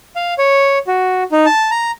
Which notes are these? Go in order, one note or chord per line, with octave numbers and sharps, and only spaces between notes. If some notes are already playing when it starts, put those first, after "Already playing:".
F5
C#5
F#4
D#4
A5
A#5